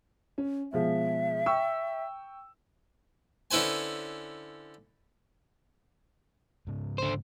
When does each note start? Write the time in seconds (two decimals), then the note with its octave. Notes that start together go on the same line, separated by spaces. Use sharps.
0.38 C#4
0.73 B2 F3 G#3 E5
1.46 G5 C#6 E6
3.51 D3 C#4 E4 B4 C5 G#5
6.67 G#2 C#3
6.98 D3 C5